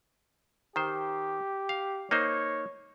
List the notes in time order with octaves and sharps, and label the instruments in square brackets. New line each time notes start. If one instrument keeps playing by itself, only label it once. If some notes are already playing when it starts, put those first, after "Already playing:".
[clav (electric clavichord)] D#3 C5 [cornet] G4
[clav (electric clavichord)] F5
[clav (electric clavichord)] A#3 D#4 C5 [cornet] C#5